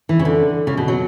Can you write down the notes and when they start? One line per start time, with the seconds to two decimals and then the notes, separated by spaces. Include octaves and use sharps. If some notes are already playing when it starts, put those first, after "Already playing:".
0.09 E3
0.19 C#3
0.25 D3
0.67 C#3
0.77 B2
0.88 F#3